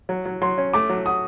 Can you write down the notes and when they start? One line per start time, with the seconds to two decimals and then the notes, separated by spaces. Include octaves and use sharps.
0.09 F#3
0.25 F#3
0.42 F#3 C6
0.58 C#4
0.73 A3 D6
0.89 F#3
1.06 F#4 D#6